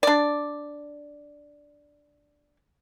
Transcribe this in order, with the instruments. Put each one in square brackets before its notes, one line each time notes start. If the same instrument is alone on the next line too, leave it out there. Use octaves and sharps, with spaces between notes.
[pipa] D4 D5